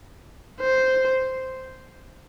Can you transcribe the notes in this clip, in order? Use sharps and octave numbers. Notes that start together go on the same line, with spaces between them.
C5